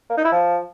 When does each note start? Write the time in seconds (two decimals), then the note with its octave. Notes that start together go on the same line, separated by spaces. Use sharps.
0.10 A#3
0.17 D#4
0.25 E4
0.32 F3